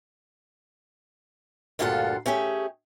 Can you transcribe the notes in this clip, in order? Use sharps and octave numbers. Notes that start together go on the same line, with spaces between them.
D2 G2 A#2 F4 A4 F#5
A3 C#4 G4 G#4